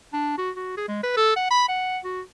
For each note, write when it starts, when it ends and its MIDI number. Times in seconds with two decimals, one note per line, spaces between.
0.13 0.36 62
0.38 0.51 66
0.56 0.74 66
0.77 0.86 68
0.88 1.01 56
1.03 1.16 71
1.17 1.34 69
1.36 1.47 78
1.51 1.64 83
1.69 1.98 78
2.04 2.21 66